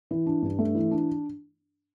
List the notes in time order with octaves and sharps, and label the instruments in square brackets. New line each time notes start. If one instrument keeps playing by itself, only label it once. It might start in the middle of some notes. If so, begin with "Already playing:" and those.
[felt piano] E3
D4
G2
A3
E3
D4